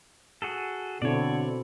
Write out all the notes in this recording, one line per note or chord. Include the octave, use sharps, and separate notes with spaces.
F#4 G#4 A4
B2 D3 C4 E4 C#5 D5